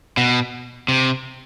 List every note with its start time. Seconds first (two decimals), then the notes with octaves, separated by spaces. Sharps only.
0.17 B2
0.88 C3